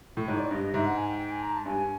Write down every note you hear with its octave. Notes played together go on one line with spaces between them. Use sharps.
A2
G#2 C#5
D5
G2 D#5
D#5
G#2 E5
F#5
G#5
G5
G5
G#5
A#5
A5
G2 G#5